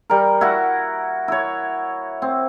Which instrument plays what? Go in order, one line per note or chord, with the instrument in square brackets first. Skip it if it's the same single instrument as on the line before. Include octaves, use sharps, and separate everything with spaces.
[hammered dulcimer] G3 A#4
E4 F#4 F#5
E4 C#5
C4